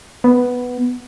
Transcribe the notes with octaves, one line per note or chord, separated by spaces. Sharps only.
B3